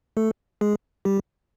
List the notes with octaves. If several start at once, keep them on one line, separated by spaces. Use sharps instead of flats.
A3 A4
G#3 G#4
G3 G4